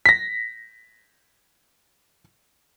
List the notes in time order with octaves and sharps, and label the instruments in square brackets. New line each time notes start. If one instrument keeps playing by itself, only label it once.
[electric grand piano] A#6 B6